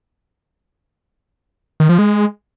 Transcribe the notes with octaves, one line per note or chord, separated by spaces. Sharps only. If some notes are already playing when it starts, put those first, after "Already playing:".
D#3
F3
G#3